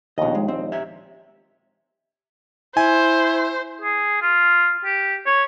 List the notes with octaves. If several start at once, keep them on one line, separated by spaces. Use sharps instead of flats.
A#1 D#2 B2 D#5
G#3
C4
G4 C#5 E5
E4 C5 G#5
G#4
F4
G4
C#5